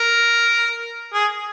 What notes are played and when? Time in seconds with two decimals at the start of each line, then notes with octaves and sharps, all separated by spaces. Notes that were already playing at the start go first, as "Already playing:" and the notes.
Already playing: A#4
1.14 G#4